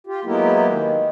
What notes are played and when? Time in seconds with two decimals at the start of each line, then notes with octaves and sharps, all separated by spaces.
0.07 F4 G4
0.25 F#3 G#3 A#3 B3 E4 G4
0.69 D#3